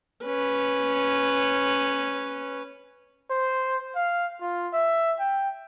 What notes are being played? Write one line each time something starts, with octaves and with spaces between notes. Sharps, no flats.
C#4 B4
C5
F5
F4
E5
G5